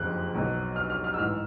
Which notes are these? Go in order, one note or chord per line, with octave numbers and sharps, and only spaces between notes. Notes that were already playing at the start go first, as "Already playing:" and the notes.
Already playing: F#1 F2 C#3 F3 F#6
B1 B2 F#3
F6
F6
F6
E6
A1 G#2 E3 F6